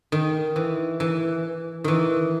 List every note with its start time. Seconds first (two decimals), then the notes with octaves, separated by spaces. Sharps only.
0.12 D#3
0.56 E3
1.00 E3
1.84 D#3 E3